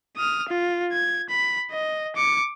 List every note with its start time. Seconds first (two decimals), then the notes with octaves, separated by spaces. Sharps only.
0.17 D#6 F6
0.49 F4
0.93 G#6
1.30 B5
1.72 D#5
2.16 D6 C#7